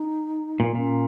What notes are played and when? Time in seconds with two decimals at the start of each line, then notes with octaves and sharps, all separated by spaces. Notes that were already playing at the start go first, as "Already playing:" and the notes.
Already playing: D#4
0.60 A#2
0.75 A#2 C#4